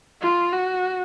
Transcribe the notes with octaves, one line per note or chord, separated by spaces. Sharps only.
F4
F#4